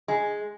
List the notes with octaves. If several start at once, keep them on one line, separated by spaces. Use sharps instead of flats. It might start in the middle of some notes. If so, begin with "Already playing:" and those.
G#3